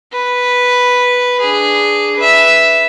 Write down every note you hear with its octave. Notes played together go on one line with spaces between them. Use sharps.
B4
D4 G#4
B4 E5